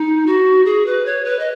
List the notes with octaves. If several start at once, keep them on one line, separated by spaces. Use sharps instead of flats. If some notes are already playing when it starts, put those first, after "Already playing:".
Already playing: D#4
F#4
G#4
B4
C#5
B4
D#5